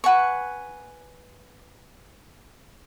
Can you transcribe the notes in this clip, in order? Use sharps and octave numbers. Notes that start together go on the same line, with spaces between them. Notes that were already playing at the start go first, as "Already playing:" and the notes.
B4 F#5 G#5 C#6